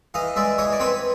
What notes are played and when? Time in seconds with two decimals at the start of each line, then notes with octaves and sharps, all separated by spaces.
0.14 E3 D#5 F5
0.36 G#3 D5 E5
0.58 E3 C#5 D#5
0.72 D5
0.80 C4 B4 C#5